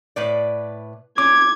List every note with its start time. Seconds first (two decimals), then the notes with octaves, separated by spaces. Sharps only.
0.16 A2 B4 D5
1.18 C#4 D6 G#6